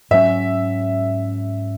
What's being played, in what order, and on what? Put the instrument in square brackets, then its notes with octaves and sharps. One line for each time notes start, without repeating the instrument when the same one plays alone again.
[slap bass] G#2 F#3 C#4 [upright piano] E5